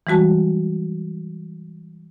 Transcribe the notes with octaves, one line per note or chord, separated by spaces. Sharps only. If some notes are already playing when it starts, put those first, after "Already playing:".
E3 G3 G#3 F#4 A5